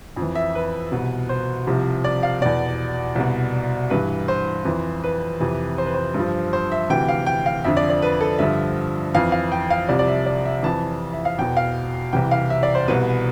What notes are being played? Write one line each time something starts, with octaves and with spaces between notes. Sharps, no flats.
F2
E3
E5
B4
C2 B2
C5
C2 C3 F3
D5
F5
E2 B2 D5
C2 B2
G2 E3 B4
C5
F2 E3
B4
F2 C3 E3
C5
B4
C5
G2 F3
C5
E5
D2 C3 E3 G5
F5
G5
F5
F2 D3 F3 E5
D5
D5
B4
A4
G2 D3 F3 E5
F2 E3 F5
F5
G5
F5
C2 C3 F3 D5
D5
E5
D5
E5
F2 E3 A5
E5
F5
E2 B2 G5
F5
C2 C3 E3 G5
F5
E5
D5
C5
C2 B2 B4